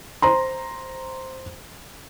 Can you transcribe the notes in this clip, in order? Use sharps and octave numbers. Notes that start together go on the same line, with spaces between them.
C5 A#5 C6